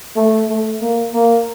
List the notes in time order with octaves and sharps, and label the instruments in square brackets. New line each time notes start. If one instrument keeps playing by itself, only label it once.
[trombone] A3
A3
A#3
A#3